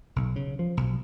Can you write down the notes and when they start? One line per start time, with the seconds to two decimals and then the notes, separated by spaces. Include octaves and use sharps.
0.16 B1
0.36 C#3
0.59 F3
0.77 B1